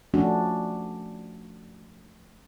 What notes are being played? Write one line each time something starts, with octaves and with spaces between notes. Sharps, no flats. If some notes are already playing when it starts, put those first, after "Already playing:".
F3 A3 C#4 D4 F#4